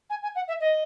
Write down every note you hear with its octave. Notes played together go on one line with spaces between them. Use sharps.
G#5
G#5
F#5
E5
D#5